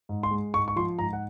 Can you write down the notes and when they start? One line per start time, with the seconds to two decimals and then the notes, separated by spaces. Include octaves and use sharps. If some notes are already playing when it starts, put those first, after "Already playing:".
0.09 G#2
0.23 C6
0.31 G#3
0.54 G#2 C#6
0.68 C#6
0.76 F3 C6
0.99 G#2 A#5
1.13 F#5